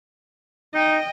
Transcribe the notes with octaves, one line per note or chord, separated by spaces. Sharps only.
D#4 D#5 G5